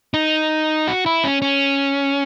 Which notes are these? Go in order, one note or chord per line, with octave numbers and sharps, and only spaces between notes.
D#4
F#4
E4
C#4
C#4